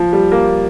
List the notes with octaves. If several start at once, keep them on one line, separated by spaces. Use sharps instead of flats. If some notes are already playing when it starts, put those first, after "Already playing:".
Already playing: F3
G3
A#3